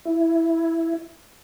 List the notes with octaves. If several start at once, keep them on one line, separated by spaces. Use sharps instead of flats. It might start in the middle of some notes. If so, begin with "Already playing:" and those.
E4